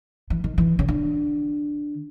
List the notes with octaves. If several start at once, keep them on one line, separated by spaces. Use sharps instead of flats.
E3
D#3
E3
C#3
D3